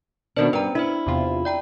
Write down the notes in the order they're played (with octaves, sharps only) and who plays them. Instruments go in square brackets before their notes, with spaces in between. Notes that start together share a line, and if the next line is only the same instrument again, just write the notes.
[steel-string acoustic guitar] B2 D#3 D4 [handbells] B3 C#4 C5
[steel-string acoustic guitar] G2 [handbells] B4 A#5
[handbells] D4 C5 [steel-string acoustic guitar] E4
[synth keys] E2 C3 F4
[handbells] D5 G5 A#5